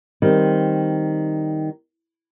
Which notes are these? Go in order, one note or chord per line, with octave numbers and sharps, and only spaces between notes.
D#3 G3 C4